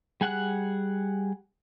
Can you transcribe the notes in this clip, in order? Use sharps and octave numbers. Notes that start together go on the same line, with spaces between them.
G3 G#4 F#5 G#5 F#6